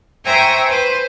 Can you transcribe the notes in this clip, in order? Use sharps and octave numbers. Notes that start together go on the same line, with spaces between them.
C5 E5 G5 G#5 A#5 C#6
B4 C5